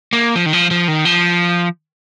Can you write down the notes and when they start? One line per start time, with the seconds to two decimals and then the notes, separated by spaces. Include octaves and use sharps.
0.13 A#3
0.36 F3
0.46 D#3
0.53 F3
0.71 F3
0.88 D#3
1.05 F3